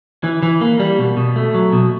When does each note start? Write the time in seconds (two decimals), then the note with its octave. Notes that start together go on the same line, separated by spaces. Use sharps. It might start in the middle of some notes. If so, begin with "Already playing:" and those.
0.24 E3
0.43 E3
0.61 A#3
0.79 G3
0.99 B2
1.17 B2
1.36 A3
1.54 F#3
1.73 B2